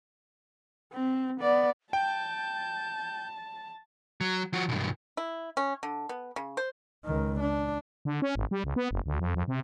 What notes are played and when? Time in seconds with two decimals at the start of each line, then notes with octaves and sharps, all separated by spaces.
0.93 C4
1.41 B3 D5
1.93 G5 A5 G6
4.21 F#3
4.53 F3 F#4
4.69 B1 G2
5.17 E4
5.57 C#4
5.83 D3
6.09 B3
6.36 C#3
6.57 C5
7.05 C#2 D#3
7.40 D4
8.05 D3
8.22 C#4
8.35 G#1
8.51 G3
8.64 C#2
8.76 B3
8.91 F#1
9.06 D2
9.20 F2
9.35 F2
9.48 C3